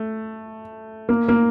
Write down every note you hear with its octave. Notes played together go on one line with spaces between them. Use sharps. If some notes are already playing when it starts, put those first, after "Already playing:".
Already playing: A3
A#3
A#3